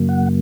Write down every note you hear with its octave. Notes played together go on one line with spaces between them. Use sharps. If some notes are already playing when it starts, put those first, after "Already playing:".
Already playing: F#2 C#3 F#3 A#3
F#5